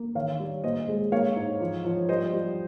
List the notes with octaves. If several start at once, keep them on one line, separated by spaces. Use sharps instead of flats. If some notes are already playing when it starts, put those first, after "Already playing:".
Already playing: A#3
D#3 C#5 F5
G3
A#2 C5 D#5
G#3
A#3 C#5 F5
G#2
F3
F3
G3 C5 D#5
G3